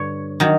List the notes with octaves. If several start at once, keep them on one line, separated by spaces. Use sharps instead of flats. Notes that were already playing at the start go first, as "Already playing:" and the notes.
Already playing: G2 D3 C#5
D#3 F#3